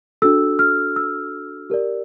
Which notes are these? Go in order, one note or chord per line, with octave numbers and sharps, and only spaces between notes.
D4 F#4 A4 E6
F6
E6
G4 A#4 D5